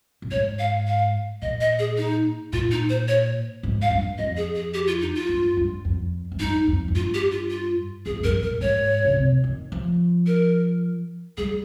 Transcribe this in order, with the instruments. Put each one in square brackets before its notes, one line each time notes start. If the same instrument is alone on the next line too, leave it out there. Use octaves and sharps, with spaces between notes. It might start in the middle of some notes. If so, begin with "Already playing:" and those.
[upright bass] A#2
[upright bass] G#2 [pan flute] C#5
[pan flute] F5
F5
[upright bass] A#2 [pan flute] D#5
[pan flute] D#5
G#4
D#4
[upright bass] A#2 [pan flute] F4
[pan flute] D#4
C5
C#5
[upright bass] G#2
[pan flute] F5
[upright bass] G2
[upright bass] F2 [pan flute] D#5
[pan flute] G#4
G#4
G4
F4
D#4
F4
[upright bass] G2
G2
F2
G#2
[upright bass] G2 [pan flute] D#4
[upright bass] F2
G#2
[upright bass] G2 [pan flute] F4
[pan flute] G4
F4
F4
[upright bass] F2 [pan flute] G#4
[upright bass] F2
[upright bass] G2 [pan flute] A#4
[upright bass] A#2 [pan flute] A#4
[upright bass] G#2 [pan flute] C#5
[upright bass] C#3
C3
D#3
F3
[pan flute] A#4
[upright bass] G3 [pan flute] G#4